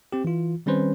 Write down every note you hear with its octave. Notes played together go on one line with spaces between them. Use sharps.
C4 G4
E3 F4
D#3 G3 C4 C#4 B4 C5